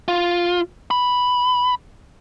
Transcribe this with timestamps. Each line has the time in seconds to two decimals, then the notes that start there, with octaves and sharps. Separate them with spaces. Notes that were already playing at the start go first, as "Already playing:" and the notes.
0.08 F4
0.91 B5